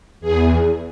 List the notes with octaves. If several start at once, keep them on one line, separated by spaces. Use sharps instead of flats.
E2 G#4